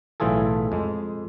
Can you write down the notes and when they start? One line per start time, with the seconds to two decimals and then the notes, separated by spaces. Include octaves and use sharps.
0.20 B1 A2 E3 F4 G#4 A4
0.72 F2 G#3